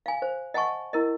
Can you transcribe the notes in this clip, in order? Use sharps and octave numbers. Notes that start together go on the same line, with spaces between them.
F5 G#5
C5
D#5 F#5 G#5 A5 C#6
E4 A#4 D#5